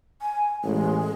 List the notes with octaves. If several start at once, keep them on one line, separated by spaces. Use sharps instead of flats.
G#5
A1 G#3